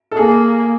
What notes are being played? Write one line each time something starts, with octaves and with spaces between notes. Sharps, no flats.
A4
A#3 G#4